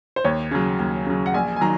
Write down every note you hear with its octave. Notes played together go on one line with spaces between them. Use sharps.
C5
D#2 C#5
C#3 F#3
D#2
C#3 F#3
F#5
A#1 G#5
G#5
D#3 F#3 A#5